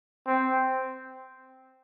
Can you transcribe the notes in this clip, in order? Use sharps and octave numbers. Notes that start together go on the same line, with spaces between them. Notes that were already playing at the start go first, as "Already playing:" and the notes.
C4